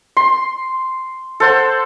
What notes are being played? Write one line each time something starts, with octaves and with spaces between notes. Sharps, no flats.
C6
A4 C5 F#5